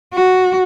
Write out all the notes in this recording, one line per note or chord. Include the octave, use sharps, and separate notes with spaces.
F#4